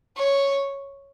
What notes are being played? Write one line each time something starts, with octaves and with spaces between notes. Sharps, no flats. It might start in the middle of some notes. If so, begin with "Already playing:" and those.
C#5